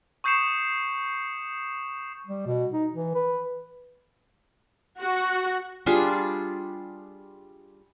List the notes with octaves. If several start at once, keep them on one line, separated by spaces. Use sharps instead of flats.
C#6 D#6 G6 C7 C#7 E7
G3
B2
D#4
E3
B4
F#4
G3 D4 F4 G#4